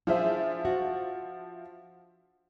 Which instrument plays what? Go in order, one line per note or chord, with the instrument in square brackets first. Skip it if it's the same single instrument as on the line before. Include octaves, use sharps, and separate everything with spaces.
[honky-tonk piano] F3 F4 E5 [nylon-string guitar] D4 G#4 C5
[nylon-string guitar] F#4